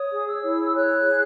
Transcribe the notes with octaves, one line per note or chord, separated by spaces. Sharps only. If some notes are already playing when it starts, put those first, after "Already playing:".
Already playing: C#5 D#6
G#4
E6
E4
C#5 F#6
G#4